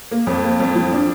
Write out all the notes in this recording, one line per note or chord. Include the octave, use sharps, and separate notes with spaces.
A#3
F2
A#3
F2
F3
D4